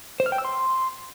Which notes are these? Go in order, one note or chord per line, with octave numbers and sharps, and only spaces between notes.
C5
F6
G5
E6
C6